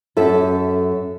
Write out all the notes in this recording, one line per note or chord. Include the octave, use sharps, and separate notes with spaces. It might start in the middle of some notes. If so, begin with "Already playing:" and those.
F#2 A4 E5